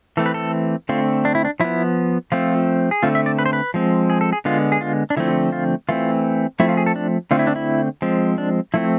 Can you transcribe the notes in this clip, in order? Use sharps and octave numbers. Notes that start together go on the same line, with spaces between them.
E3 A3 C4 A4
B4
A4
D3 A3 C4 F4
D4
E4
D4
F3 B3 E4
F3 A3 C4 F4
G#4
D3 A3 C4 F4
E5
D5
B4
C5
B4
F3 G#3 C4
G#4
A4
G#4
D3 G#3 B3 F4
G#4
F4
D4
D3 F3 A3 C4 E4
F4
E3 A3 C4 F4
F3 A3 C4 E4
F4
G#4
A4
D4
D3 A3 C4 F4
E4
D4
E4
F3 G#3 C4
D4
F3 A3 C4 E4